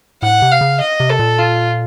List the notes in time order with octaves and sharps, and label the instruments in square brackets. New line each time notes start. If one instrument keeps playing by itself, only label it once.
[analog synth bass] A2 [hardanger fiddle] F#5
[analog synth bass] C3
[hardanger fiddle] F5
[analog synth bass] C#3
[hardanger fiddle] D#5
[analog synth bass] C3
[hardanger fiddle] A4
[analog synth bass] A#2
[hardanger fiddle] F4